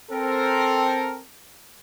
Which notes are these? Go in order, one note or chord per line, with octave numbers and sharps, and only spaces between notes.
C4 A4 A#4